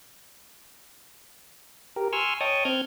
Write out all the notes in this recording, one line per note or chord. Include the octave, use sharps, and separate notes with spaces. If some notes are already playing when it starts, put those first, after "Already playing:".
G4 A#4
G#5 C6 C#6 E6 F6
C#5 D#5 G5 A5 C#6 D#6
C4 F6 G6 G#6